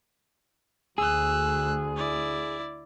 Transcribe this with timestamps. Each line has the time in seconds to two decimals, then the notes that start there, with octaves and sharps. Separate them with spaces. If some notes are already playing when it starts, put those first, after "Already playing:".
0.98 D2 G#4 E6 F#6
1.97 E4 D5